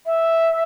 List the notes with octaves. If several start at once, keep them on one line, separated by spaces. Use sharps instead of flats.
E5